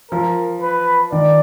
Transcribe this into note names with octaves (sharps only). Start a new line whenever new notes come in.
F3 A#4
B4
D#3 D5